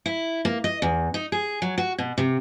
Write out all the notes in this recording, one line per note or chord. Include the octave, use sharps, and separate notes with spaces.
E4
A#3
D#5
E2
D#4
G#4
F#3
F#4
B2
C3